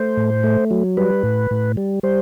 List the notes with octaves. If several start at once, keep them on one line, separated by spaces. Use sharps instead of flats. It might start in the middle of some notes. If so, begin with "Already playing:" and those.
Already playing: A3 C5
A2
A3
F#3
G3 B4
A2
A2
G3
G3 C5